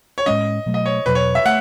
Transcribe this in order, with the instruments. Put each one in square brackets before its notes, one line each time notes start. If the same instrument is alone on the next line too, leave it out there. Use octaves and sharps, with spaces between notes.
[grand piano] C#5
[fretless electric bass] A2 G#3 C#4 [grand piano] D#5
[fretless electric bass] B2 F#3 A3
[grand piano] D#5
C#5
[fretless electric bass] E2 B2 F#3 [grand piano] B4
[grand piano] C#5
E5
[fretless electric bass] A3 [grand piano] F#5